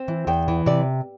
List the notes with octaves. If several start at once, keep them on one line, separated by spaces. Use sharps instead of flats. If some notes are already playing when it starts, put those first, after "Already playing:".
Already playing: C4
E3
E2 G5
E3
C3 D5